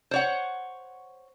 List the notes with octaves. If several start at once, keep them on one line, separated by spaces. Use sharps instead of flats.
C5 C#5 F#5